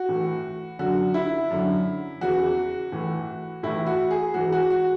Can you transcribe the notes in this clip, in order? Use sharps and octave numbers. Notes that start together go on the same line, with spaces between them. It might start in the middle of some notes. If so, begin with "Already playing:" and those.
Already playing: F#4
A2 E3
F#2 D3 F#4
E4
F#2 D3
E2 C#3 E3 F#4
A2 E3
A2 E3 E4
F#4
G#4
G#2 E3 F#4
F#4
F#4